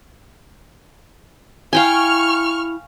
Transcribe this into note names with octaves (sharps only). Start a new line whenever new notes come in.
E4 F5 G5 G#5 C#6 F6